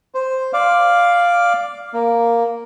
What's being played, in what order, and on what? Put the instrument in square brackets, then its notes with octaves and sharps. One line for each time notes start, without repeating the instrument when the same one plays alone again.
[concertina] C5
D5 F5
A#3